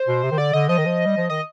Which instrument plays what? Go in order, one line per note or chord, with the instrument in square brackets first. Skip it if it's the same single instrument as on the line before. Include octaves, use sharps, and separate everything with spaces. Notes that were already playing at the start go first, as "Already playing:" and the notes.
Already playing: [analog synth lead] C5
[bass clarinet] B2
C3
D#3
[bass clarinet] D3 [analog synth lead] D5
[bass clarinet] D3 [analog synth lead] D#5
[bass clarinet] F3 [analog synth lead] D#5
[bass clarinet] D#3
F3
G3
F3
[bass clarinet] D#3 [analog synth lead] D#5